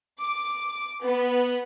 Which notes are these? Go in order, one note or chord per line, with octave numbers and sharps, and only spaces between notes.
D6
B3